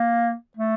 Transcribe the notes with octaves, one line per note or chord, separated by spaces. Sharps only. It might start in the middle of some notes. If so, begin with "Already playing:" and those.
Already playing: A#3
A3